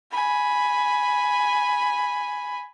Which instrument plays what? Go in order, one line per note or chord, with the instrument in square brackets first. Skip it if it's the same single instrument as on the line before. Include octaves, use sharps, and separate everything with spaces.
[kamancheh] G#5 B5